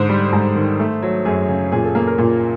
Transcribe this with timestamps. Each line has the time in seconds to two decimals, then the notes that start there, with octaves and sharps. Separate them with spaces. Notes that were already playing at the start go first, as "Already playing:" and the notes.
Already playing: G#2 D3 C5
0.09 G3
0.32 G#2
0.56 D#3
0.80 A3
1.02 F#3
1.25 F#2 G#4
1.49 C#3
1.72 A#2 G#4
1.84 A4
1.95 A#3 A#4
2.07 A#4
2.18 A#2